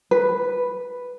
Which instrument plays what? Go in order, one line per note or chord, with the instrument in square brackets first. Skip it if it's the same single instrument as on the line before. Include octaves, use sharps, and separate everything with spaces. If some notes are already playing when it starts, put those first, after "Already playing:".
[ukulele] B4